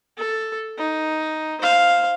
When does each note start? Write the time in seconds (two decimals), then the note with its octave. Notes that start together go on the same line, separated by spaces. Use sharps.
0.18 A4
0.78 D#4
1.61 C5 F5